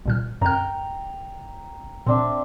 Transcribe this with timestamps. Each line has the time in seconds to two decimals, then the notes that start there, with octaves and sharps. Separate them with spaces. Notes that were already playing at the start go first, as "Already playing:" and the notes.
0.05 C2 A#2 F6
0.41 F#2 G5 A#5 F6
2.06 A#2 C4 D4 E5